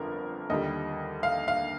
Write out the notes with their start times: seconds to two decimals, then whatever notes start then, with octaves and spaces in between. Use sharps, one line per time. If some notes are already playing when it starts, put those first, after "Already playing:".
Already playing: G1 F2 D3 F3 A#4
0.50 D#2 D3 G3 D#5
1.23 F5
1.48 F5